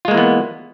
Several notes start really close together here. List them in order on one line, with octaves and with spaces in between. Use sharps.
F4 G#3 A#3 E3 B3